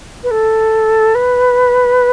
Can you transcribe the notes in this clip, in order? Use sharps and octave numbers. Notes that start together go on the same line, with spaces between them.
B4
A4
B4